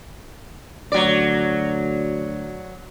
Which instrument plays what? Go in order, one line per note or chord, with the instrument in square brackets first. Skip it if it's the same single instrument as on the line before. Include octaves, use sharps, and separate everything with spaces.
[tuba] D2 [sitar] F#3 D5